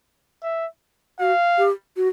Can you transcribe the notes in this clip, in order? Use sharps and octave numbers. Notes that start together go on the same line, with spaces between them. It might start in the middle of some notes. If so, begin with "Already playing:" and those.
E5
F#4 F5
G4
F#4